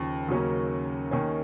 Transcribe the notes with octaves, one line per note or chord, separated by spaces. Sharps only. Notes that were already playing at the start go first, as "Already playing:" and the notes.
Already playing: D#2 C#3 F3
D#2 C#3 F#3 A#3 C#4
D#2 D#3 A#3 C#4